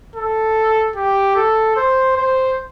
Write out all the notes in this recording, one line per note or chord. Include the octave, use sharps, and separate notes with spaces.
A4
G4
A4
C5
C5